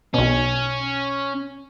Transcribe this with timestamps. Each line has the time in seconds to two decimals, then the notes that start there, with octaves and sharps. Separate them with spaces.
0.14 B1 B2 C#4